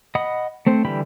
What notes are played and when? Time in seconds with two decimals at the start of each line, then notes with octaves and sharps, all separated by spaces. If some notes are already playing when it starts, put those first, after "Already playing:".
0.15 D#5 F#5 B5 D#6
0.67 A3 C4 C5
0.85 D3 E3 G3 G5 B5